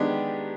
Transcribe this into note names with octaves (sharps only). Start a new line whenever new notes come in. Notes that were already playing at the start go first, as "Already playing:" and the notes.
Already playing: D#3 G#3 B3 D4 G4